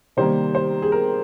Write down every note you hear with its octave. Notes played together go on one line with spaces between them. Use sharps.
C3 D#3 G3 A#3 C5
C5
G#4
A#4